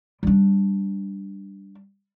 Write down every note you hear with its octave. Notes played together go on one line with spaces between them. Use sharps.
G3 D4